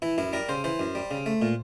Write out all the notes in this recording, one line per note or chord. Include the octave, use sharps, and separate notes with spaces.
E3 E4
F#2 E4
G3 A#4
C#3 C5
E3 C5
F#2
G3
C#3
A3
A#2